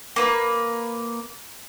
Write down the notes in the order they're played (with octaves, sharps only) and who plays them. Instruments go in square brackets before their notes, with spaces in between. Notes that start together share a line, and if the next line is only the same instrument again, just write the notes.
[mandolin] A#3 B4